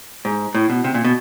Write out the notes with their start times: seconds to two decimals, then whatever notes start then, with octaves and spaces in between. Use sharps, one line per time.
0.25 G#2
0.55 A2
0.70 B2
0.84 C3
0.94 A#2
1.04 B2